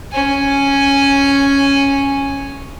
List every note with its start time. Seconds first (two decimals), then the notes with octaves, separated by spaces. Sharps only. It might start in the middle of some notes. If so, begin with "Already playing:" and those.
0.12 C#4 G#5